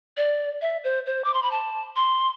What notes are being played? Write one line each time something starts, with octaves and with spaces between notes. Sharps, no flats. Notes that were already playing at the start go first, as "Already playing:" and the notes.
D5
E5
C5
C5
D6
C6
B5
A5
C6